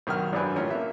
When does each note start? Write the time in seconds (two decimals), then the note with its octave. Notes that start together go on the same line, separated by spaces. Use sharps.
0.07 B1 D#3 A#4 F#5 F6
0.32 G#1 F#2 D4 B4 G#5
0.56 A1 C#4 F4 A#4
0.70 A#3 E5